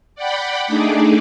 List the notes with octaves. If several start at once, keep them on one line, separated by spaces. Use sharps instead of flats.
D5 F#5 G5 B5
A3 D4 D#4 G#4 D5